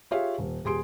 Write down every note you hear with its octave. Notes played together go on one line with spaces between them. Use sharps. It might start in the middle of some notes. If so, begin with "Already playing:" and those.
F4 G4 G#4 C#5 E5 F5
D#1
D#1 G4 G#4 C6 D7